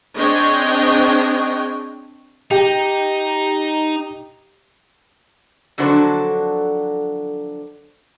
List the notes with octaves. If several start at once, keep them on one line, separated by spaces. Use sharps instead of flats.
C4 D4 G#4 C#5 D#5 G5
D#4 G4
F2 D3 F#3 D4 F#4 C5